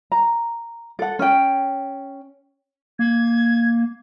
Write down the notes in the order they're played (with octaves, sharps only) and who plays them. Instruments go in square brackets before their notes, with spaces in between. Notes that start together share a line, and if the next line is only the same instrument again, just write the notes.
[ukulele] A#5
A4 F#5
C#4 G5
[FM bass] A#3 [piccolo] G#6